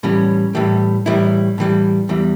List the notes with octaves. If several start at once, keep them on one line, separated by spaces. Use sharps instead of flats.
A2 E3 G3 C#4
A2 E3 G3
A2 E3 G3 E4
A2 E3 G3
E2 E3 G3